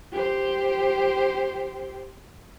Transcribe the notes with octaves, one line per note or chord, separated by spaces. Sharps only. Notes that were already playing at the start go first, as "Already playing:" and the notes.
G4 C5